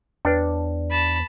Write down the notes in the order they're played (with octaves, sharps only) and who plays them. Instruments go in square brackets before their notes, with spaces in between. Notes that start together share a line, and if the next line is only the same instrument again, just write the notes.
[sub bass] E2 [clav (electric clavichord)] D4 [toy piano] B4 C#5 G5
[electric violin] A5 B5